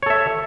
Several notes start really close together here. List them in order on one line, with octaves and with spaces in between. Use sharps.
C#5 A4 E5